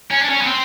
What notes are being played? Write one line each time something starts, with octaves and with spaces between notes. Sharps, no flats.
C#4
D4
C#4
B3
C4